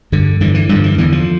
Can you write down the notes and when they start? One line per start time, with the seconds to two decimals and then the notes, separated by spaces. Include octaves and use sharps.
0.12 G2 D3
0.41 G2 D3 E3
0.55 E3
0.69 G2 D3 F3
0.84 E3
0.98 E2 D3 E3
1.12 F3